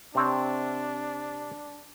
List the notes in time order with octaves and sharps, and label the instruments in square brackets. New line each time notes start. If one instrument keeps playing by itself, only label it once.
[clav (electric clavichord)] C3 C4 C#5 [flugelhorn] D4